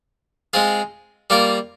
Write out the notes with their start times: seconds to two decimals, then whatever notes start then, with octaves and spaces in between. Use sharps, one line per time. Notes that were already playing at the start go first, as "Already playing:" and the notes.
0.53 G#3 C4 F4 G#4
1.30 G3 A#3 F4 A#4